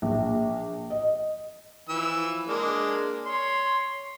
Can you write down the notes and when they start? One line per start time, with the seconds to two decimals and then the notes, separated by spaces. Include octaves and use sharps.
0.02 A#1
0.90 D#5
1.89 E3 F3 E6
2.47 G#3 A#3 D4
3.26 C#5 C6